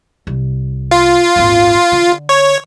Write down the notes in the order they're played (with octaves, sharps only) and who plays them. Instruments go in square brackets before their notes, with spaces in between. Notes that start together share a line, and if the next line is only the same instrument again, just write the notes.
[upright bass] C2
[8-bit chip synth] F4
[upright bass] D#1 G#1
D3
[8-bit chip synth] C#5